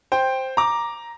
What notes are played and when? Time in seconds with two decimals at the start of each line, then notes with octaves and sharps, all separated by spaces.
0.12 C5 G5
0.57 A#5 D6